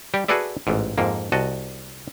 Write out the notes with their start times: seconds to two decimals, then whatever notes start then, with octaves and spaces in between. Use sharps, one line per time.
0.14 G3 G4
0.28 F#4 G#4 A4 B4 D5 E5
0.67 A1 G#2
0.98 F2 G#2 A#3
1.32 C2 F#4 D#5 A5